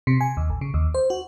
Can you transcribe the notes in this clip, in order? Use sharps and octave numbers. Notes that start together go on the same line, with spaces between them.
C3
G#5
D#2
A1
C#3
D#2
C5
F#4